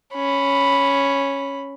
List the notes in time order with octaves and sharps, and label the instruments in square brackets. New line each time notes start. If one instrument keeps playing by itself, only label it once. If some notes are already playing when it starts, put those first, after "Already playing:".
[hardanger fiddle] C#4 B5